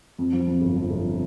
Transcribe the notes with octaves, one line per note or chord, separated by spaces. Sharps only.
F2
F3
F2
G1
F3
G1